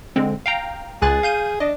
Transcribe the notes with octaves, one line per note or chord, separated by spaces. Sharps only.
D3 G#3 C4
F5 G5 A#5
C#2 G#4 F#6 A6
F5 G6 D#7
D4 D#5